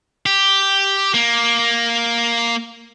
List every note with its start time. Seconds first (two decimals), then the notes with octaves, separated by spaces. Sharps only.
0.26 G4
1.14 A#3